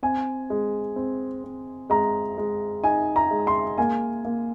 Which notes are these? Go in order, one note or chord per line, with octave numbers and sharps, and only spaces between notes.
C4 G#5
G#3
C4
C4
G#3 A#5
G#3
D#4 G#5
A#5
G#3
C6
A#3 G#5
A#3